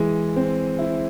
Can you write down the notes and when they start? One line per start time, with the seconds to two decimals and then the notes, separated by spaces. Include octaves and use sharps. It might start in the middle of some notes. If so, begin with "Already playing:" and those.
Already playing: E3 G#3
0.36 C4
0.79 E4